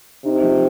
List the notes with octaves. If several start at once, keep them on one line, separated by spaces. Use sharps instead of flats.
C3 D#4
F3